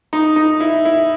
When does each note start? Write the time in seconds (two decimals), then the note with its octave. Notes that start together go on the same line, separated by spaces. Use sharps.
0.13 D#4
0.36 D#4
0.60 E4
0.85 E4